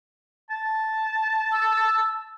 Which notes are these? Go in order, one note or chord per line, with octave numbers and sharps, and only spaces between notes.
A5
E6